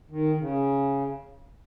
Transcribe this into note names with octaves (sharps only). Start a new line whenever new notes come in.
D#3
C#3